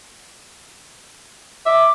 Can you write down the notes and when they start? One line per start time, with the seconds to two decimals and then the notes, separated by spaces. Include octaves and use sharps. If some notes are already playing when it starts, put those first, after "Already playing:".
1.66 E5 D6